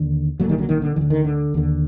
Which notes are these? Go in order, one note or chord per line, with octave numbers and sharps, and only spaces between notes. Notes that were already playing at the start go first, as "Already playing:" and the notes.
Already playing: D#2 D3
C2 A#2 F#3 A3
D#3 G3
D3 F#3
D#3
D3
D2 D3 D#3
D#3
D3
D#2 D3